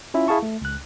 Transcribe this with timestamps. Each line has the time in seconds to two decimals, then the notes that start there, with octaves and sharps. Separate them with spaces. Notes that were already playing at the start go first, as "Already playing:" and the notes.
0.14 C#4 E4 F4 E5
0.28 E4 G#4 F5 A5 C#6
0.43 A3
0.62 C#2 F#6